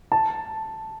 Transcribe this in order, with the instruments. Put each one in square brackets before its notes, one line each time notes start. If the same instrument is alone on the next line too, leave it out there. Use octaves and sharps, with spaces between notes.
[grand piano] A5